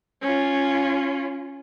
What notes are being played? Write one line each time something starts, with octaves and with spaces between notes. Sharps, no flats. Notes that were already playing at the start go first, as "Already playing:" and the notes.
C#4 F4